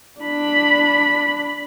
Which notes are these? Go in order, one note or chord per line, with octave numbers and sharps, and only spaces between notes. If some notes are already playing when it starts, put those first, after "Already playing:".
D4 B5